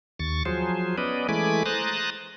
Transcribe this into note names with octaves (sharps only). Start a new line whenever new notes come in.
D#2 C#6 A6
F3 F#3 G#4 C5
B3 C#4 B4 D5 D#5
E3 G#3 A3 G#5 B5 D6
C5 A#5 D#6 F#6 A6